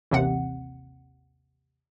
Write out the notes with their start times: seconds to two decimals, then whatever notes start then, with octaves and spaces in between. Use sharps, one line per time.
0.11 A1 D#2 C3 C4 F#5